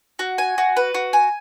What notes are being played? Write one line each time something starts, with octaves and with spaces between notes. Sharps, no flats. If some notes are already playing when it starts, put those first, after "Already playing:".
F#4
G#5
F#4
B4
F#4
G#5